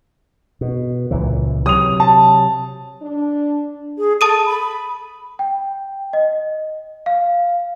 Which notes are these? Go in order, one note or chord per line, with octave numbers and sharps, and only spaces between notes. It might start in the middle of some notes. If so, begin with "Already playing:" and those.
B2
C#2 A#2 E3
C3 F#3 D#6 F7
A5
D4
G#4
A4 A5 D#6 D#7
B5
G5
D#5
F5